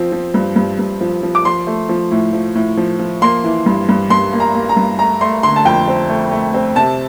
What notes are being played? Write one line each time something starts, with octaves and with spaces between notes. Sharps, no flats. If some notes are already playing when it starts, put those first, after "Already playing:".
Already playing: F3 C4
F3
G2
G2
G2
F3
F3
D6
F3 C6
A3
F3
A2
F3
A2
F3
F3
A#3 C6
E3
G2
G2
G2 C6
A#3
A#5
A#3
A#5
G2
A3 A#5
A3 C6
D3 C6
A5
F2 G5
C4
A3
A3
C4
C3 A5